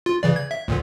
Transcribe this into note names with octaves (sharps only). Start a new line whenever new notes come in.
F4
C#3 E3 D5
G#6
E5
D2 A#2 D3